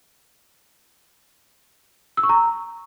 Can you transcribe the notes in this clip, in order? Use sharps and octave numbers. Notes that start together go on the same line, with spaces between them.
E6
C#6
A#5